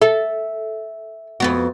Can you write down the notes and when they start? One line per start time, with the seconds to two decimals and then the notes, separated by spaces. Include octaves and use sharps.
0.02 A4 E5
1.40 F2 B3 F#4